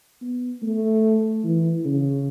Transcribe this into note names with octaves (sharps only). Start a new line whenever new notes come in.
B3
A3
E3
C#3